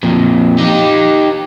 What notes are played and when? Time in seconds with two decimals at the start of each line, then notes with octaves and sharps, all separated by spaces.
0.03 F2 A#2
0.58 D#4 G4